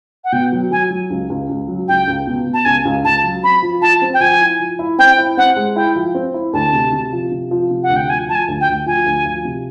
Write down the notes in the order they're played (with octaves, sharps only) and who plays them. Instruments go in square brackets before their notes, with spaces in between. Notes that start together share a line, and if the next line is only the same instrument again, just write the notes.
[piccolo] F#5
[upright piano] B2 [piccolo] G5
[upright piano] F#3
[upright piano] F#3 [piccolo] G#5
[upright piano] F#3
C#2
C#2
C#2
F#3
[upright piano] C#2 [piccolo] G5
[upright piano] C#2
B2
B2
[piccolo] A5
[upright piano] C#2 [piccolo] G#5
[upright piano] C#2
[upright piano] C#2 [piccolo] A5
[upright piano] F#3
[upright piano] C4 [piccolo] B5
[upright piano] F3
[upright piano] F3 [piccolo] A5
[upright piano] C4
[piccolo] G5
[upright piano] F3 [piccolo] G#5
[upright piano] E4
F3
E4
[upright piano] C4 [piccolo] G5
[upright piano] E4
[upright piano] C4 [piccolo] F#5
[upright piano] G#3
[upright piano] E4 [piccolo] G5
[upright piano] F3
C4
E4
[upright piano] D2 [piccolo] A5
[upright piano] C3
C3
F3
C3
F3
C3
[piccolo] F#5
[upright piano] D2
[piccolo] G5
[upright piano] F3 [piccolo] G#5
[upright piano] F3 [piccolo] A5
[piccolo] G#5
[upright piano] D2
[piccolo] G5
[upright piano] D2
[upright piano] F3 [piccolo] G#5
[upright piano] D2
F3
C3